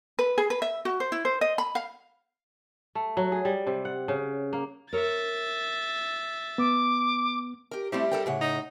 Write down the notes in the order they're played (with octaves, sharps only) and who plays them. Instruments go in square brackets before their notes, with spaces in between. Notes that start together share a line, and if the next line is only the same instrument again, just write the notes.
[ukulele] B4
G#4
B4
E5
F#4
C5
E4
C5
D#5
B5
F5
[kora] A3
F#3
G#4
G3
C3
F#5
C#3
A#3
[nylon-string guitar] A#4 C#5 [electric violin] E5 A6
[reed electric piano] B3 [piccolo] D6
[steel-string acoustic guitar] G4 A#4
[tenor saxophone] G3 [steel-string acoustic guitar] A3 C4 E4
[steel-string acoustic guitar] A4 A#4 G5
A2 C#3 F#5
[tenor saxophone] D#4